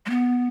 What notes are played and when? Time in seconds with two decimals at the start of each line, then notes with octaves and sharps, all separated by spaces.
0.06 G#3
0.10 B3